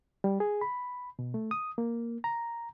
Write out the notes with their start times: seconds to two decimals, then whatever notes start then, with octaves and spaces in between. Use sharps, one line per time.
0.24 G3
0.40 G#4
0.61 B5
1.19 B2
1.34 A3
1.51 D#6
1.78 A#3
2.24 A#5